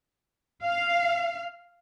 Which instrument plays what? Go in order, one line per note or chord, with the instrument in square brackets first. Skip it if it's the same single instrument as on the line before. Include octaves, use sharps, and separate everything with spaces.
[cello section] F5